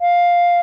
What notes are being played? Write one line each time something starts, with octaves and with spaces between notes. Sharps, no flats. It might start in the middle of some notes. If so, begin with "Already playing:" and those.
F5